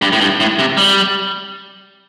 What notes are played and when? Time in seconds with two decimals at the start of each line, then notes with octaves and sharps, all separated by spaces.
0.02 G2
0.13 A2
0.21 G2
0.40 A2
0.59 C3
0.77 G3